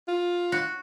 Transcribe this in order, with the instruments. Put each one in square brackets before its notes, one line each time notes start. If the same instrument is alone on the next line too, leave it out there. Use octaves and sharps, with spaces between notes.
[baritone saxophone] F4
[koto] F#4